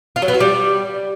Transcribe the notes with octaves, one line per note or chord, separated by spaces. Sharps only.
F4
F#3
B3
F#4
G3